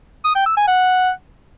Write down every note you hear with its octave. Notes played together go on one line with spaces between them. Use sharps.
D#6
G5
E6
G#5
F#5